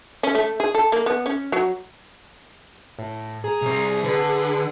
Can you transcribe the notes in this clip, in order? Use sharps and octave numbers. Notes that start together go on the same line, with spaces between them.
C#4
A3
G#4
A4
A#3
B3
C#4
F#3
A2
G#4 A#5
C2 C4
D3 B4